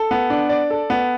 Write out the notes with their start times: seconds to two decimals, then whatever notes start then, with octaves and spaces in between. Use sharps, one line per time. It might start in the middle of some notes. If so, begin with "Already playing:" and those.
Already playing: A4
0.11 B3
0.30 D4
0.49 D5
0.70 A4
0.90 B3